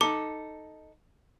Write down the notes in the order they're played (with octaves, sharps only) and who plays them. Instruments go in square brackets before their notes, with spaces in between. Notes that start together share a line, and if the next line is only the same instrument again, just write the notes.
[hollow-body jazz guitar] D#4 A4 [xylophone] D6